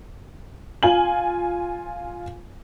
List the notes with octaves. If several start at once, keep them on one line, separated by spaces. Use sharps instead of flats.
F4 G#5 F#7